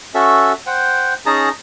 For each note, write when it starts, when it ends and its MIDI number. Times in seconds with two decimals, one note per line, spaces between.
0.15 0.53 61
0.15 0.53 66
0.15 0.53 69
0.15 0.53 76
0.67 1.14 72
0.67 1.14 78
0.67 1.14 79
1.26 1.49 61
1.26 1.49 63
1.26 1.49 68
1.26 1.49 81
1.26 1.49 82